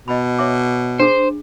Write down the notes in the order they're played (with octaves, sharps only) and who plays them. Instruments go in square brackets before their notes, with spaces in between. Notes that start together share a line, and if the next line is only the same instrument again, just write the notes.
[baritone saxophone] B2 [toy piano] D#5 B5
[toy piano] C#5 E5 D6
[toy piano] D4 G#4 [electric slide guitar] C5